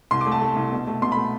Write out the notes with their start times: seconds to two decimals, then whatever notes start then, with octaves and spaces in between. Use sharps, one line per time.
0.11 C2 C6
0.21 D6
0.26 A3
0.31 A5
0.42 A3
0.56 C2
0.72 B2
0.87 A3
1.02 B2 C6
1.12 A3 B5